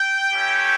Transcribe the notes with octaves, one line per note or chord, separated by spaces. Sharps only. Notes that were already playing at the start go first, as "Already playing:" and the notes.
Already playing: G5
A3 C#4 E4 G4